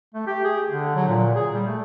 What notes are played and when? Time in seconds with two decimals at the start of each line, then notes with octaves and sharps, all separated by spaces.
0.14 A3
0.27 G4
0.44 G#4
0.69 D3
0.96 F#3
1.08 A#2
1.35 G#4
1.54 G3
1.67 A3